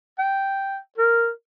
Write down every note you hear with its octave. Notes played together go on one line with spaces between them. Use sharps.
G5
A#4